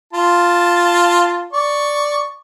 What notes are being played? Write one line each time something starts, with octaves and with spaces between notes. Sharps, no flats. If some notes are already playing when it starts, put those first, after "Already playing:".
F4 A5
D5 C#6